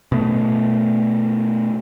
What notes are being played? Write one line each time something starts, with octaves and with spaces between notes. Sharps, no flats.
B2 A3